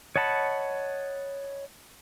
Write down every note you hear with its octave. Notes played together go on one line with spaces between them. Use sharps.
C#5 D#5 F#5 A5 B5